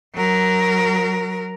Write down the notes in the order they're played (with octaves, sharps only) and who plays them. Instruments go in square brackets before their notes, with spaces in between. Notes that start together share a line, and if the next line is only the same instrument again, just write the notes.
[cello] F#3 A#4